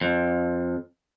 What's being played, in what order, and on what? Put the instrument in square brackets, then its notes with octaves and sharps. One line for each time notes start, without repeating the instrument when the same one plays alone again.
[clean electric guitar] F2